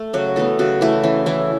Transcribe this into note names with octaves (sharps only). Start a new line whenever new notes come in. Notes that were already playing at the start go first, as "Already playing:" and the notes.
Already playing: A3 A4
C#3 F#3 F#4
E3 A3 B3 A4
C#3 F#3 F#4
E3 A3 E4
E3 C#4
E3 A3 E4